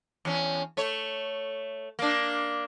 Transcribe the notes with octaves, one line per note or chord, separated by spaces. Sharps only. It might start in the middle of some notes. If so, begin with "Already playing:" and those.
E2 C#4
A3 C#5
A#3 D4